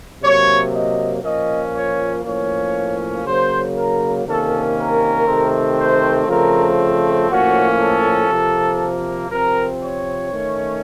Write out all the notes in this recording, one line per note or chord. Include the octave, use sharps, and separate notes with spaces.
C3 F#3 A#3 C#5
D#5
A#2 F3 A#3 C#4 D#5
C#5
A2 F3 A#3 C#4 C#5
C#3 F#3 A#3 C5
A#4
C3 D#3 A#3 C#4 A4
A#4
C3 D#3 A3 C4
C5
C#3 F3 A3 C4 A#4
A2 F3 A#3 C#4 F#4
A4
C3 F3 A#3
C3 F3 C4 A#4
C#5
D#3 A3 C#4